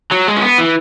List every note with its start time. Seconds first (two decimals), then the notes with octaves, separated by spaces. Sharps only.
0.11 F#3
0.27 G#3
0.36 C#4
0.42 B3
0.58 E3